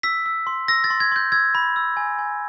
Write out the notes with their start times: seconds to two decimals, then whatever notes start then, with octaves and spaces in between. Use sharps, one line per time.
0.03 E6 B6
0.26 E6
0.47 C6
0.68 E6 A#6
0.84 A6
0.90 C6
1.00 G#6
1.12 C6 G6
1.32 E6 G#6
1.55 B5
1.76 E6
1.97 G#5
2.19 G#5